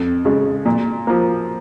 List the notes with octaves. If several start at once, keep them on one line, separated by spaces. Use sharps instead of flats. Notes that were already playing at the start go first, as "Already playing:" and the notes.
Already playing: F2
C#3 G#3
A#2
F3 A#3